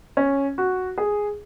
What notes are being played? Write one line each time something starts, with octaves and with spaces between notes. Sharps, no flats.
C#4
F#4
G#4